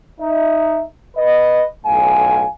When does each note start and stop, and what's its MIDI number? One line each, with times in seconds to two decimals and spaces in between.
0.21 0.83 63
0.21 0.83 76
1.17 1.64 71
1.17 1.64 75
1.86 2.45 35
1.86 2.45 45
1.86 2.45 77
1.86 2.45 80